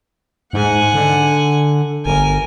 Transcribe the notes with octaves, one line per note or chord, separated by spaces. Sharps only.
G#2 F#5 G#5
D3
G1 A#4 G#5